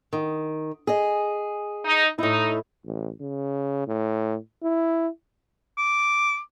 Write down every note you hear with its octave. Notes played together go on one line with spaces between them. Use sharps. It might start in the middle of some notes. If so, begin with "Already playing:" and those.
D#3
G#4 D#5
D#4
A2 D#4 E4
A1
C#3
A2
E4
D6